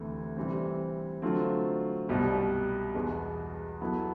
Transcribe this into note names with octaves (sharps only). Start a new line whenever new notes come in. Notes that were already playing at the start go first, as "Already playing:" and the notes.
Already playing: D2 C3 E3 A3
C3 E3 G3 C4
D3 F#3 A3 C4 F4
C2 B2 G3
E2 B2 G#3 B3
F#3 B3 E4 A4